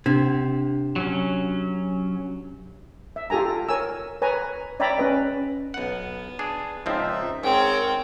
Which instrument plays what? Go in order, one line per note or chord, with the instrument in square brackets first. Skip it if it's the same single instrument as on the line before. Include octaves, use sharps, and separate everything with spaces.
[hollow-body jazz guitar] C3 [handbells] D4
[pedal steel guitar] F#3 C#4
[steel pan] E5
F4 G4 A4 G#5 A#5
A#4 C#5 G#5 E6
B4 C#5 G#5 A#5
C#5 D5 E5 G5 A#5 B5
C#4 B4 D#5
[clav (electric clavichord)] B1 F#5 [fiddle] B3
[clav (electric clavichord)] D4 G#4
[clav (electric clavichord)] C#2 F3 C4 [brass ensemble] D#4 E5
[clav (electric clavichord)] G#2 [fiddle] C4 G5 [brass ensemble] G#4 A#4 C#5